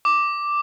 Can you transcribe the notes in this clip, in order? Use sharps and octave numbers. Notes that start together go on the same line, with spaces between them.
D6